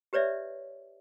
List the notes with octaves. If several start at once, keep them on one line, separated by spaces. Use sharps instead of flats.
G4 B4 C#5 D5 E5